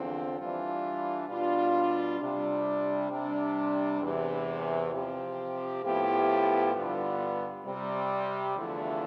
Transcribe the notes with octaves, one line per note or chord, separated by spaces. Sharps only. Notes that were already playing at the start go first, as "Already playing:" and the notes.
Already playing: E2 D3 F3 C4
E3 G3 D4 F4
B2 G3 D4 F4
C3 G3 D4
C3 G3 D4
E2 C3 E3
C3 F3 C4 G4
A2 F3 B3 E4 G4
G2 D3 G3 B3 F4
C3 G3 C4
E2 D3 F3 A3 E4